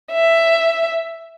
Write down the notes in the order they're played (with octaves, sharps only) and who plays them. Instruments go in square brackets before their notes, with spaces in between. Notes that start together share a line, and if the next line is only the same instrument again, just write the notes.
[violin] E5